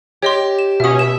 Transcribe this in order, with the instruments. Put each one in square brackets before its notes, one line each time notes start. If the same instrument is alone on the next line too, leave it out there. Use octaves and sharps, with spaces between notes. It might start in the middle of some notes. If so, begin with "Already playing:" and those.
[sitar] G4 [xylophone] C#5 D#5 C6
[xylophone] E7
[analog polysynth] B2 C#4 [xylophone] E5 D#6
[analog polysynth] B2 E5 [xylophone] E7